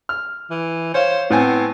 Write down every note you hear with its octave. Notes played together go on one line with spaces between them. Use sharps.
F6
E3
C5 C#5 F5
A2 B3 C4 G#5